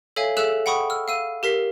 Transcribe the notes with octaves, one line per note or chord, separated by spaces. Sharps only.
A4 C#5 E5 F5 G#5
G#4 A4 E5 E6 F#6 E7
F#5 G5 B5 C#6 D#6
E6 F6
F5 E6 D#7
G4 A#4 B6 C7